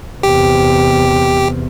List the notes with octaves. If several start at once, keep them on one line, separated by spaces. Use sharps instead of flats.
E2 C3 G4